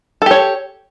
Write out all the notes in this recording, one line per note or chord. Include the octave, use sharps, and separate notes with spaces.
G4 A4 C#5